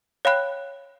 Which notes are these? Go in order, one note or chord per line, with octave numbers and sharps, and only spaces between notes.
C#5 F5 G5 B5 F#6